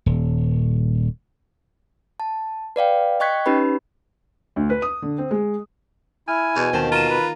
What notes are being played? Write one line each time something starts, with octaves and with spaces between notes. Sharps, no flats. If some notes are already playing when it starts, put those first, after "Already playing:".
D#1
A5
B4 D5 F5 G5
D#5 G5 C#6 F#6 G#6 B6
C#4 D#4 G4 B4 B5
D2
B4
D#6
D3
C4
G#3
E4 G#5 F6
E2 B2
D#2 C4 A5
F4 F5 A#5 D#7 E7
B4